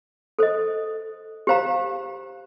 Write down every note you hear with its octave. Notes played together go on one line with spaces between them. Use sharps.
A4 C5 D#5
G4 C5 F5 A#5